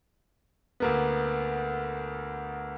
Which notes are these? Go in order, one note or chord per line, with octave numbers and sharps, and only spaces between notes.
D2 A#3 B3